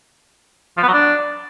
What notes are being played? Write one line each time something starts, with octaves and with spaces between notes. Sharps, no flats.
F3
B3
F#3
D4